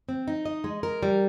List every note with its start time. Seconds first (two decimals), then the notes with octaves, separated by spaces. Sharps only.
0.09 C4
0.28 D#4
0.45 D#5
0.64 G#3
0.83 A#4
1.03 G3